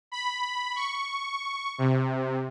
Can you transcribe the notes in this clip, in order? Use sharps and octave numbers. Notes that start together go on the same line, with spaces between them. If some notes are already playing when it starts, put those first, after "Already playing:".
B5
C#6
C3